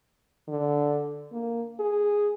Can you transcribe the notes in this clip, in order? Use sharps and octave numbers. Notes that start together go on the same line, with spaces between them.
D3
A#3
G#4